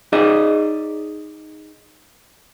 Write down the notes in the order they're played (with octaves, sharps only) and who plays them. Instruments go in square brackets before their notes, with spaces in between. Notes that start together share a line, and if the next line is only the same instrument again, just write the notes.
[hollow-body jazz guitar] D#4 G#4 D5 D#5